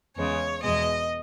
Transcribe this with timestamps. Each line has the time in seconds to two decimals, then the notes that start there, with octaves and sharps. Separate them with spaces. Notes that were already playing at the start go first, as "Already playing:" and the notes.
0.17 E2 C#3 G#3 C#5
0.63 E2 B2 G#3 D#5